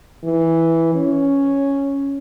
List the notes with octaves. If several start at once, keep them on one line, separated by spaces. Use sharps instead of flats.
E3
C#4